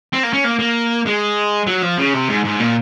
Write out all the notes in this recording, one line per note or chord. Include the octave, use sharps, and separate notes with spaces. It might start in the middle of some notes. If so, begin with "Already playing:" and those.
C4
A#3
C#4
A#3
A#3
G#3
F#3
F3
C#3
C3
G#2
G#2
A#2